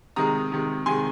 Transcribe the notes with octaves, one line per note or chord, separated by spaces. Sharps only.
C3 D#3 G#3 A#5 D#6
C3 D#3 G#3
C3 D#3 G#3 G#5 C6